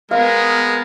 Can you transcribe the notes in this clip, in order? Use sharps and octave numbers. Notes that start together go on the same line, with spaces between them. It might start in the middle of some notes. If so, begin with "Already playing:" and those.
G#3 B3 A#4 F5